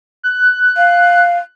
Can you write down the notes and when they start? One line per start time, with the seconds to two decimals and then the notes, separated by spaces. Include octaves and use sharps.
0.23 F#6
0.77 F5